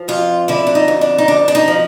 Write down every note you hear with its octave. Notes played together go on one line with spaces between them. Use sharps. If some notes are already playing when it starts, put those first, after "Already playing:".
Already playing: F3
F2 F4
D3 E4
D4
D#4
F2
D4
D#4
F2 D4
D4
D#4
F3